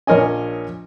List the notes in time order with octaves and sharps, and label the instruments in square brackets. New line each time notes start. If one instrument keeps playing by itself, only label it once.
[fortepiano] A#1 A#4 C#5 D#5 G#5